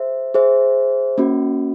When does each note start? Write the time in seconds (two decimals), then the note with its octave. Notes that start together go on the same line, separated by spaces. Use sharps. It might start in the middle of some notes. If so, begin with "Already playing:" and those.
Already playing: G#4 C5 E5
0.34 G#4 C5 E5
1.18 A#3 C#4 F#4